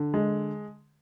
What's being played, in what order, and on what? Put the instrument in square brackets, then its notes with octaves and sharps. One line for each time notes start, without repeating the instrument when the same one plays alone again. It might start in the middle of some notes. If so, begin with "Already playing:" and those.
Already playing: [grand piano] D3
G#3